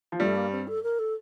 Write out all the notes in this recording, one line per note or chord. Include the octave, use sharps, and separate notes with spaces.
F3
G2 G3 A3
A#3
C4
A4
A#4
A4